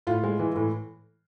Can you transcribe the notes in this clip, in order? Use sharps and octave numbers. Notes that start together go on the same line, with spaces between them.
A2 F4
G#3
E3
A2